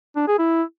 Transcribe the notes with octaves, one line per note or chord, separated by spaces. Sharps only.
D4
G#4
E4